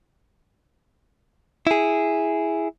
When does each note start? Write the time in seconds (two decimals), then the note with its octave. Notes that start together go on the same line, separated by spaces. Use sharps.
1.67 E4 G#4